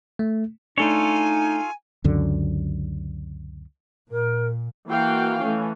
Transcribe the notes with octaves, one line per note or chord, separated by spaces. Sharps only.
A3
A3 D4 D#4 F4 A4 C#5 G#5
C#2 F#2 D3
A#2 A#4
E3 A#3 F#4 F5 G5
E3 A3 C#4